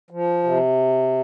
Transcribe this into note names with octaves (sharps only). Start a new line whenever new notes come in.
F3
C3